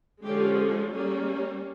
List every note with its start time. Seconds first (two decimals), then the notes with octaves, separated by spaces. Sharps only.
0.24 D3 F3 G#3 C#4 G4
0.93 G3 A#3 C#4 G#4